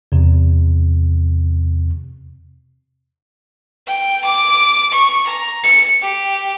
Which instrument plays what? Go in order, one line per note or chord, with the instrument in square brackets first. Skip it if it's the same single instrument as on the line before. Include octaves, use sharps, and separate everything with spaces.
[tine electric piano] E2 C3
[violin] G5
D6
C#6
A#5
C#7
G4